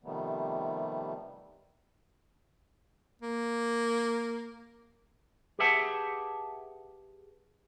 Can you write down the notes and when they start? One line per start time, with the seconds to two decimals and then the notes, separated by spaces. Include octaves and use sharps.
0.03 C3 D#3 F3 G3 A3 B3
3.22 A#3
5.59 G4 G#4 B4 E5 F#5 A5